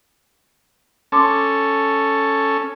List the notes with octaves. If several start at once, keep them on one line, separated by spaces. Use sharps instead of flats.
C#4 A4 A5 C6 D6